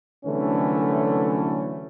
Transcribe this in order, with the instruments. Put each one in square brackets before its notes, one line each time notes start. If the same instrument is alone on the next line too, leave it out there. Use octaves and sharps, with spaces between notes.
[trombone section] C2 D3 E3 F#3 A3 C#4